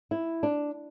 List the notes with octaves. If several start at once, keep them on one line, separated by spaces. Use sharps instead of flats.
E4
D4